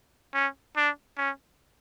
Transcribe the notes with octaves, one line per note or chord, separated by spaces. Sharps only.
C#4
D4
C#4